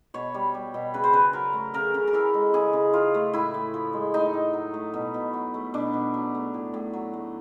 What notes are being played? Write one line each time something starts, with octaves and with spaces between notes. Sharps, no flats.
B2 C#5
G3
G3
B2
C#3 B4
C5
C#3 B4
F#3 A#4
A3
C#3 A#4
C#3
A#4
E3 A4
G#3
C#3 G#4
C#3
F3 F4
A3
A2 E4
A2
F3
G#3
A2 D#4
A2
F#3
A3
B2
B2
F#3
A3
B2 D4
B2
F#3
A3
A2
A2
F#3
A3